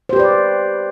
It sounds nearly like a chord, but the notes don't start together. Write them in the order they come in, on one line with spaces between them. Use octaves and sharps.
C5 G4 B4 D5